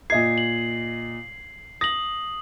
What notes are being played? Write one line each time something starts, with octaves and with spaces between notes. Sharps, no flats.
A#2 D#5 G#6 C7
F#7
D#6 A#6 F#7